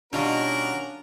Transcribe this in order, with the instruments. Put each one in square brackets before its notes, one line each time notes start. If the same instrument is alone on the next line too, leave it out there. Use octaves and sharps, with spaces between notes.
[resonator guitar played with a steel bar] B2 D#3 G3 [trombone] C#4 [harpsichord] D4 F4 [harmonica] F#4 A#4